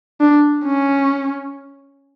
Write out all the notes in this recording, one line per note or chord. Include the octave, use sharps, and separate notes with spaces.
D4
C#4